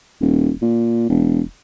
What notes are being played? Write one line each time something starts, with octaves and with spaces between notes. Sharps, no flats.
D#1
A#2
E1